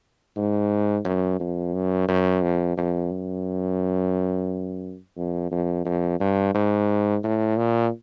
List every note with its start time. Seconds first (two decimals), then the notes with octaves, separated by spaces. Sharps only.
0.36 G#2
1.05 F#2
1.40 F2
1.74 F#2
2.08 F#2
2.43 F2
2.77 F2
3.11 F#2
5.17 F2
5.51 F2
5.85 F2
6.20 G2
6.55 G#2
7.24 A2
7.57 A#2